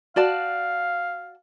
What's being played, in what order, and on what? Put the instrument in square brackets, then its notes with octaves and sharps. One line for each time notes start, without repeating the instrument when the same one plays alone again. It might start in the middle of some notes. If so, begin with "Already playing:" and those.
[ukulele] F#4 D5 A5 [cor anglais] F5